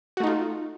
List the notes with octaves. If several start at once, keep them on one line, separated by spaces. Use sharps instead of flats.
A3 D#4 F4 F#4